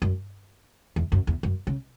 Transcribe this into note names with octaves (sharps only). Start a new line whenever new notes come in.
F#2
E2
F#2
E2
F#2
C#3